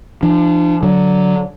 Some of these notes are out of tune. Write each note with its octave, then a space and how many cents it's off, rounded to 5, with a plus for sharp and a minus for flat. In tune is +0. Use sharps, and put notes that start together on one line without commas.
F3 -35 D4 +20
D3 -10 F#3 +0